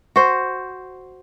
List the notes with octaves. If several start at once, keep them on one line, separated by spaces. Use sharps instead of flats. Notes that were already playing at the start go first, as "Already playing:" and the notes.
F#4 C5